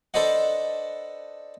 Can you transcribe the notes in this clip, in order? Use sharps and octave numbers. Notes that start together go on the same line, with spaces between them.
D4 A4 B4 C5 D#5 F#5